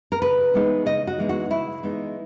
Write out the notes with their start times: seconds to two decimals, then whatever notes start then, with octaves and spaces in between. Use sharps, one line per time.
0.12 A#4
0.22 C#3 B4
0.54 E3 G#3 B3 D#4
0.86 C#3 D#5
1.07 F#4
1.18 E3 G#3 B3 D#4
1.29 F#4
1.50 C#3 E4
1.83 E3 G#3 B3 D#4